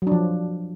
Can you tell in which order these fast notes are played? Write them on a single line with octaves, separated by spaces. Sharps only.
F#3 D4 F3